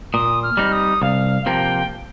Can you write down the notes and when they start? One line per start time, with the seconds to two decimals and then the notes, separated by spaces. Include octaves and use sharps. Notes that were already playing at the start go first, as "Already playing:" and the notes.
0.13 A#2 D#6
0.43 F6
0.57 G3 C4 D#4
0.72 D#6
1.02 C2 F5
1.46 C3 F3 A#3 G5